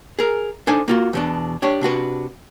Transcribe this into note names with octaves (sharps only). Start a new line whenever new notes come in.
G#4 A#4
D4 D#4 A4 C5 G#5
A#3 F4 F#4
E2 B2 D4
D4 G4 C#5
C3 D4 F#4 B4